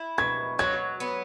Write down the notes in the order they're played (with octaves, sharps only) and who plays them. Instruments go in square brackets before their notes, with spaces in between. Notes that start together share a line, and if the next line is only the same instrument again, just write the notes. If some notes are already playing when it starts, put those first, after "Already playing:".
Already playing: [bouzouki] E4
[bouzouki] B2 [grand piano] G#6
[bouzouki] F#3 [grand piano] G#6
[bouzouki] B3